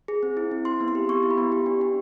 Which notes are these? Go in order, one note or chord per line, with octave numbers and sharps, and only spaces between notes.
G#4
C4
E4
C4
E4 C6
B3
C6
G4
B3 C#6
E4
B5
B3
G4
D4
D4